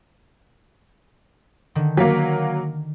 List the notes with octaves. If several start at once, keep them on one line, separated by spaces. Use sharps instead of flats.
D3 D#3
F#3 A#3 B6